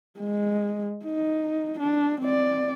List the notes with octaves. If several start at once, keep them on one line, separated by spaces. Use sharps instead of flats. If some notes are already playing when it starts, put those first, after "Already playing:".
G#3
D#4
D4
C4 D5